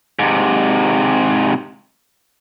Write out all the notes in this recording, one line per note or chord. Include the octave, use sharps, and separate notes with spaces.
G#2 C3